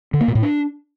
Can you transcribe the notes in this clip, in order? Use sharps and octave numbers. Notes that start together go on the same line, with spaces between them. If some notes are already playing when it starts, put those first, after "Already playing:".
D3
A#3
A#2
A2
D4